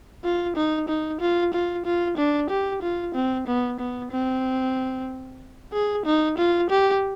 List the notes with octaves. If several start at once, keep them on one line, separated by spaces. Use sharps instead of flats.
F4
D#4
D#4
F4
F4
F4
D4
G4
F4
C4
B3
B3
C4
G#4
D#4
F4
G4